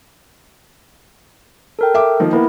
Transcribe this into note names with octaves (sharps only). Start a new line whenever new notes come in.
A4 A#4 G5
E5 D6
D#3 F3 A#3
A#3 B3 E4